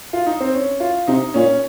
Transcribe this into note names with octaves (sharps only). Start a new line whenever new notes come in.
F4
D#4
C4
C#4
F4
C3 D#4
A#2 C#4